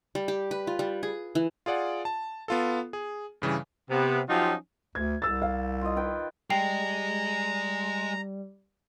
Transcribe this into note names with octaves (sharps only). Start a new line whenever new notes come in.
G3
G4
B4
F4
G3
G#4
E3
F4 G#4 D5 F#5
A5
B3 F4 A4
G#4
G2 C#3 E3 G3
C3 B3
F3 F#3 C#4 D#4 F4 G4
D2 G#6
C2 E6 A6
F5
F4 D#5
D#3 B4 G5
G3 G#3 G5 A#5 C7 F7